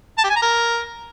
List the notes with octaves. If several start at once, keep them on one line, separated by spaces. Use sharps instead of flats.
A5
G4
G#5
A#5
A#4